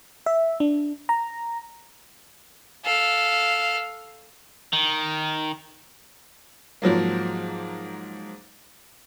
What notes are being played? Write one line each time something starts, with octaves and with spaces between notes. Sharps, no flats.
E5
D4
A#5
A4 F5
D#3
G#2 F3 F#3 A#3